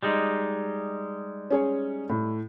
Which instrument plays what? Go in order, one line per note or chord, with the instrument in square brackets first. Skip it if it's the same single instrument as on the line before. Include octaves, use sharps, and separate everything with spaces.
[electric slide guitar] G3 G#3 D#4
[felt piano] C#4 G#4 C#5
A2